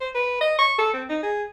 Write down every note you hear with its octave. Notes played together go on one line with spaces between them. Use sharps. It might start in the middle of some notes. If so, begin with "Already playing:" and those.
C5
B4
D#5
C#6
A4
C4
D#4
G#4